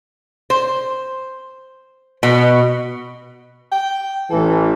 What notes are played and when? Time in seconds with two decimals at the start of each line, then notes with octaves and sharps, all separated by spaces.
0.50 C5
2.23 B2
3.72 G5
4.30 A1 E3 A4